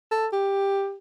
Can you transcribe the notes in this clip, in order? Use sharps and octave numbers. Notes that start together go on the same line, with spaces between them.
A4
G4